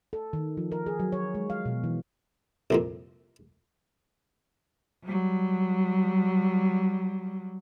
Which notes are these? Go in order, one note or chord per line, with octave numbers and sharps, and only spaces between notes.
A4
D#3
F3
A#4
G#4
F#3
C#5
G#3
F5
B2
E3
C2 F2 A#2
F#3 G3